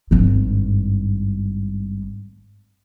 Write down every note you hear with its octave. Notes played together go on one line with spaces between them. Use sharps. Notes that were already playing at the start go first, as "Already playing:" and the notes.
G#1 G2